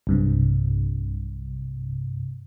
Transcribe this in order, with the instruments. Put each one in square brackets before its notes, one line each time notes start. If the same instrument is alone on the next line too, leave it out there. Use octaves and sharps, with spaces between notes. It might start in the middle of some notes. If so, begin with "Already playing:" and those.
[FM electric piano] B1 G2 C3